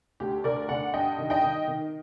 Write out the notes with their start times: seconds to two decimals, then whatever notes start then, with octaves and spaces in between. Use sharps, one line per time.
0.20 D2 G4
0.44 D3 A#4 D5
0.69 D3 D5 F#5
0.94 G2 D#5 G5
1.18 D#3
1.30 D#5 G5
1.42 D#3
1.68 D#3